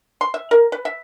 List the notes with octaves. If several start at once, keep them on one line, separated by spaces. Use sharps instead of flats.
C6
E5
A#4
B4
E5